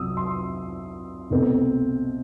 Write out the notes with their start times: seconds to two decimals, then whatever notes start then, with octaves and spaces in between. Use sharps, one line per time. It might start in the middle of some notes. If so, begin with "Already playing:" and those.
Already playing: C2 C3 F#3 D#6 E6
0.17 C6
1.30 C2 B2 A3 C4